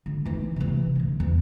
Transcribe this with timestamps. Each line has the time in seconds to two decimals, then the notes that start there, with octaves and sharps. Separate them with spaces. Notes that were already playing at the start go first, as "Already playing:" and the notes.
0.06 D3
0.25 E3 D#4
0.56 C3 E3
0.95 A1 D2
1.20 E2